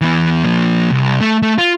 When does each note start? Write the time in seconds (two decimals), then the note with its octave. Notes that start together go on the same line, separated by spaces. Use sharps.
0.01 E3 B3
0.44 F3 A#3
0.90 C2
1.21 A3
1.42 A3
1.58 F4